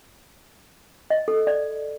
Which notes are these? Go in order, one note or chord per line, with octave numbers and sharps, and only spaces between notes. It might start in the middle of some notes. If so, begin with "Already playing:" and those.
D#5
A4
D5